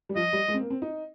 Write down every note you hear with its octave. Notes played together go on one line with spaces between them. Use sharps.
G3
F3 D#5
G3
G#3
C4
A#3
C4
D#4